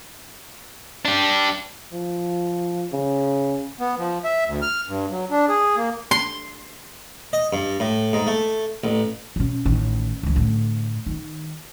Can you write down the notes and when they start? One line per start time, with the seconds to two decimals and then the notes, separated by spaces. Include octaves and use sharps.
1.05 D4 G4
1.93 F3
2.92 C#3
3.79 B3
3.98 F3
4.24 E5
4.46 D2
4.62 F6
4.88 G2
5.10 F#3
5.31 D4
5.49 G#4
5.76 A#3
6.11 C6
7.33 D#5
7.53 G2
7.80 A2
8.13 G#2
8.27 A3
8.84 A1
9.36 B2 C#4
9.65 A1 D#3
10.23 C#2 E3
10.36 A2 D3
11.07 D#3